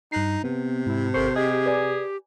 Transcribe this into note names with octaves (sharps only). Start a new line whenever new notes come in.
G2 D#4 F#6 C7
C3 B3
G#2 E4
G#1 A4 A#4 C5 C#6
G4 G#4 D#5
B4 D5 G#5